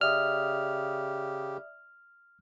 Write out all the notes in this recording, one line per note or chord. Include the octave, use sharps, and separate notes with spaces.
C#3 G4 D5 E5 D#6 F6